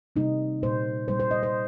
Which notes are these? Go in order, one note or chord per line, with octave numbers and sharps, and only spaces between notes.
C3 G3 A#3 D#4
A#2 G3 A#3 C5
A#2 G3 A#3 C5
C5
D#5
C5